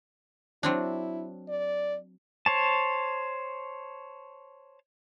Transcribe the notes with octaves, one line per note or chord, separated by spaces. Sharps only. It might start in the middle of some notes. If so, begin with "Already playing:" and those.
F#3 C4 D4 E4
D5
C5 C#5 A5